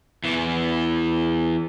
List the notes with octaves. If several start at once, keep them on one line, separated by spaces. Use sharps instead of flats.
E2 E3